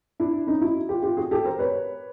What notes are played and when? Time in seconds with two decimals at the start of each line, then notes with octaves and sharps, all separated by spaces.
0.20 D4 E4
0.47 C#4 D#4
0.61 E4 F#4
0.89 F4 G4
1.03 F4 G4
1.17 F#4 G#4
1.31 G4 A4
1.45 A#4 C5
1.59 B4 C#5